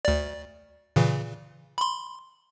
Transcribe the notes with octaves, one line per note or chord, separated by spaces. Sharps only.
D2 D5
A#2 C#3 E3
B5 C6